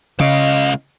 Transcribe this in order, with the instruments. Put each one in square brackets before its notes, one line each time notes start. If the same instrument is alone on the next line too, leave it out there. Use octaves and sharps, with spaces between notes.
[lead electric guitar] C#2 F5 [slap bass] C#3 [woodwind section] D#5